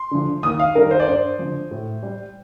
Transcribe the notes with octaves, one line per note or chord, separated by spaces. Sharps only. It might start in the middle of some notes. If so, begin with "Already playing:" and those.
Already playing: C6
D3 F3
D#2 D#6
F5
D#3 G3 A#4
C5
D5
G2 C5
D3 F3
A2
G3